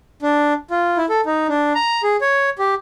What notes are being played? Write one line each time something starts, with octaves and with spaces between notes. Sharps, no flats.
D4
F4
E4
A4
D#4
D4
A#5
G#4
C#5
G4